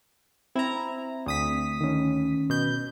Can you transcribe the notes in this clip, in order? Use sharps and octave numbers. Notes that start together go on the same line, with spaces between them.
C4 E4 A#5
D2 D#6 B6
D#3 C#4
B2 G6